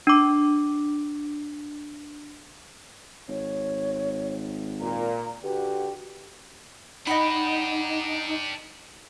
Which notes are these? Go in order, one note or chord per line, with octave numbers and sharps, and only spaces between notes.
D4 D6
G#1 C#5
A#2 A#5
D3 F#4 G4 B4
D4 D#4 G4 D#5 F#5 B5